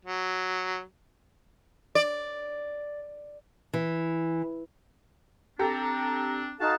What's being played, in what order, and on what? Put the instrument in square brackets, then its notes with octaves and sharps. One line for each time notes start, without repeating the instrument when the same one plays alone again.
[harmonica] F#3
[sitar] D5
[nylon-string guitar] E3
[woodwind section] C4 D4 [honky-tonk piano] G4 A4 [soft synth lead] A#5
[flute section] D#4 A4 F#6 [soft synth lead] F#4 [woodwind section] F5 A5